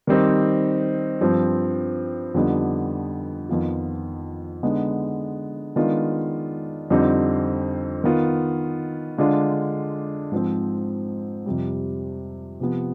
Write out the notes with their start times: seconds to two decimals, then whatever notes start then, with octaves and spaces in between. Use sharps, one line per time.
0.07 D#3 G3 C4 D#4
1.21 G2 F3 C4
2.34 F2 D3 G3 B3 D#4
3.49 F2 D#3 B3 F4
4.63 D3 G#3 B3 D#4
5.76 D#3 G#3 B3 D4 F4
6.90 F2 D3 G3 C4 D#4
8.04 D#3 B3 F4
9.18 D3 G#3 D4 F4
10.32 G#2 F3 C4
11.46 F2 C3 G3
12.60 C3 F3 B3